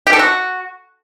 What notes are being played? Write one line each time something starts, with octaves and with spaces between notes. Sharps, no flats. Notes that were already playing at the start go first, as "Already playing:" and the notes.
G4
A4
F#4